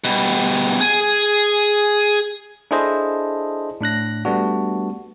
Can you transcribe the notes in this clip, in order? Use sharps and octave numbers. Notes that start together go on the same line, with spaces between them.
B2 G3
G#4 G#5
D4 E4 G#4 A4 C5 D#5
A2 D4 F#6 A#6
G3 A3 B3 D4 F#4